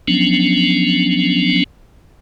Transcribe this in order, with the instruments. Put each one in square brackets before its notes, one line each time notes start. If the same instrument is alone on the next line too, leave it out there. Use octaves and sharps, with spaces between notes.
[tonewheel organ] F3 F#3 B3 C#4 D4